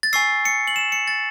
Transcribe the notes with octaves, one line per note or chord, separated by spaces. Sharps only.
A6
G#5 C#6 E6 C7
C#7
F#7
E7
C#7
A6